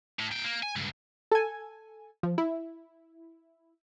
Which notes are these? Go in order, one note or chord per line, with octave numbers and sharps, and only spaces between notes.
A2
A#2 G5
A#3
G#5
C#2 G2
A4 G#5
F3
E4